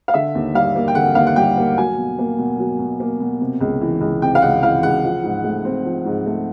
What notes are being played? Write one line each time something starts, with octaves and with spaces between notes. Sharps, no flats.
F5
D3 E5
D#2
G3 F5
A#3
G5
D3 F#5
D#2 F5
F#5
G3 G5
A#3
F#3 G#5
B2
A#3
B2
F#3
B2
A#3
B2
C3
C#2
E3
C#2
C3 G5
F5
C#2 F#5
E3 F5
C#2 F#5
F3
G#2
A3
C4
F3
G#2
A3